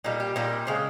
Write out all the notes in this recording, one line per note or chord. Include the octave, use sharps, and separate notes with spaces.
A#2 G3 D#4
G4
A#2 G3 D#4
C#3 G#3 C4